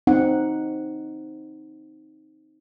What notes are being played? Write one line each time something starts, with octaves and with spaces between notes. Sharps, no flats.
C4 D#4 F#5